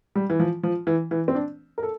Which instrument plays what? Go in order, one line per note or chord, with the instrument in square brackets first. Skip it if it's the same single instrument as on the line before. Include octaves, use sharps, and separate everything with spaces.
[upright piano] G3
E3
F3
F3
E3
E3
C4
D4
A#4
A4